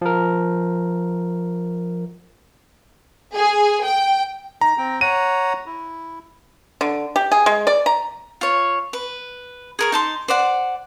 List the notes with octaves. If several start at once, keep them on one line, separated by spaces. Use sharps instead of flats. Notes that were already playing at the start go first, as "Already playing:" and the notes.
F3 A#4
G#4
G5
D#4 A#5
C4 G5
C#5 F#5 A#5 D#7
E4
D3
G4
G#4
G#3
D5
A#5
F4 C#5
B4
G#4 A#4 C#5
D#4 A5 C6
C5 D5 F#5